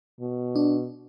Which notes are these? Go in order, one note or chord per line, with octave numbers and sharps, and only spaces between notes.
B2
D4